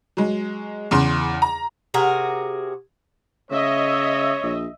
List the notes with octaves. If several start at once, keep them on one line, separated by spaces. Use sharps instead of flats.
F#3 G#3
E2 C#3 C6
A#5
C3 F#4 G#4 A#4
C#3 C#5 D#5 E5
A#1